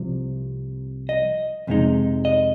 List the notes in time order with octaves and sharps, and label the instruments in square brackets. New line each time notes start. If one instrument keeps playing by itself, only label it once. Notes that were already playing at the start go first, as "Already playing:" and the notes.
Already playing: [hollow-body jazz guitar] C2 C3 F3
D#5
F2 C3 G#3 D#4
D#5